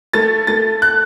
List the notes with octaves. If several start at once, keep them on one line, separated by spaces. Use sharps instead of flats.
A3 A6
A3 A6
F#6